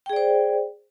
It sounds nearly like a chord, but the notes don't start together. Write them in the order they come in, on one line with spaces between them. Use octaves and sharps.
G5 G#4 D5 C5